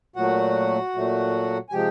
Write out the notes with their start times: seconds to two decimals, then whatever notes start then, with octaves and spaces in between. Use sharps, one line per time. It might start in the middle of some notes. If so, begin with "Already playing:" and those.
0.16 A#2 F#3 A3 F#4 F#5
0.95 A#2 F#3 A3
1.69 G#5
1.73 C3 F3 G#3 G4 G5